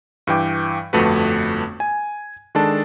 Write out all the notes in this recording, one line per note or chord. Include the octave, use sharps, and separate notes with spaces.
G2 E3 G5 D6
G1 F2 A3 F#4 B4
G#5
D#3 G#3 D4 A4 A5